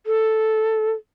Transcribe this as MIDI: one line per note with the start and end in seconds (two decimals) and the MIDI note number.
0.07 0.91 69